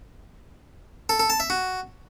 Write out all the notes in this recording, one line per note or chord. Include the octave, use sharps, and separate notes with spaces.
A4
A4
A5
E5
F#4